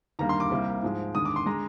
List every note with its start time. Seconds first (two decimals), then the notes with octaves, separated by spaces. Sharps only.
0.19 D#2 D3 G3 A#3 A#5
0.29 C6
0.40 D6
0.51 C2 C3 G3 A#3
0.83 G#2 F3 G#3
1.15 D#2 D3 G#3 D#6
1.25 D6
1.36 C6
1.46 D3 G#3 A#5